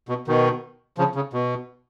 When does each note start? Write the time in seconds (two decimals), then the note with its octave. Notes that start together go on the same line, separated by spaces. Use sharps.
0.09 B2
0.28 B2 D#3
0.98 C#3 F3
1.15 C#3
1.33 B2